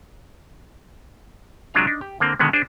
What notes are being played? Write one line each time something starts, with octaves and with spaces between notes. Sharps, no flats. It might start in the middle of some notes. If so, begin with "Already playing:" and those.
C3 F#3 G#3 D4 F4 F5
D4 D#4
G4
D3 A#3 C4
B2 D3 D#3 G#3 B3
D4 G#4 C5